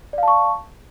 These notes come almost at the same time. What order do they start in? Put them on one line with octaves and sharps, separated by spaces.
D5 F5 A5 C#6